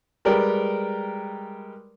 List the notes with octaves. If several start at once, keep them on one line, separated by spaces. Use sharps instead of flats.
G3 G#3 A#4 B4 D5 G5